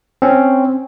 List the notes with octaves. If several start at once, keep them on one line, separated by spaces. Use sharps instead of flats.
C4 C#4